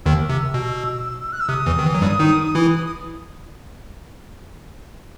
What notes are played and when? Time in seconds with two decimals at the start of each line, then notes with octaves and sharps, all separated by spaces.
0.06 D#2 D#3 E6
0.29 C3
0.54 B2
1.32 F#6
1.40 E6
1.48 C3 D#6
1.66 E2 E3
1.79 D#3
1.86 E3
1.94 F#3
2.01 G2 G3
2.19 D#3 D#4
2.55 E3 E4
2.87 D#6